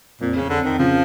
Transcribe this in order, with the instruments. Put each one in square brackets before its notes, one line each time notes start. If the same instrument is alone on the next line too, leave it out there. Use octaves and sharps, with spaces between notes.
[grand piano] F2 [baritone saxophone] A#2
[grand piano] F2 [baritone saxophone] C#3
[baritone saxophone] D3
[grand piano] F2
[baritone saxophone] D#3
[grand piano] C#3 [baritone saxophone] F3